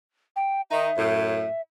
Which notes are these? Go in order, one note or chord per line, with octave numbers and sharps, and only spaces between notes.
G5
D#3 D#4 E5
F#2 A2